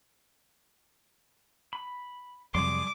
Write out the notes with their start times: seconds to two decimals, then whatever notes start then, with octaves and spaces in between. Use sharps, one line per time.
1.73 B5
2.55 F2 C3 F#3 G3 G#4 D5 C6 D6